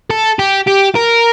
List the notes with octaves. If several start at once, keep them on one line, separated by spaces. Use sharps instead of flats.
A4
G4
G4
A#4